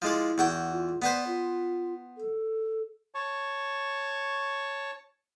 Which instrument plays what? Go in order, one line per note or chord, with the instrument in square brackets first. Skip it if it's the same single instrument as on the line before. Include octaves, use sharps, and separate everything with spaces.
[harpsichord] F3 G#3 D5 [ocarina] E4
[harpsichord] E2 F#4 G5
[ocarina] F4
[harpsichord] B3 B4 C5 [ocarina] D5
[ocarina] F4
A4
[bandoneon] C#5 A5 C#6